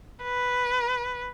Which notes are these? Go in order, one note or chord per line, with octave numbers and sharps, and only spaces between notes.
B4